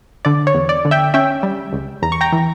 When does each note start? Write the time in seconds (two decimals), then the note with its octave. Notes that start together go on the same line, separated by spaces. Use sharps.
0.25 D3 D5
0.47 C#5
0.54 E2
0.69 D5
0.85 D3
0.91 E5 G5
1.14 C#4 E5 G5
1.43 G3
1.73 C#2
2.02 E2 A#5
2.12 C#6
2.21 G5 A#5
2.32 E3